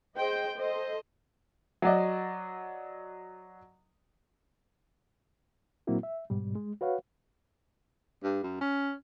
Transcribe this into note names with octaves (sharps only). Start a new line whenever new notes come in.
G#4 C5 D#5 G5
A4 C5 D#5
F#3 F#4 D5 D#5
A#2 F#3 A#3 C4 E4 F#4
E5
G#2 B2 G3
G#3
F#4 B4 C#5 F5 F#5
G2
F#2
C#4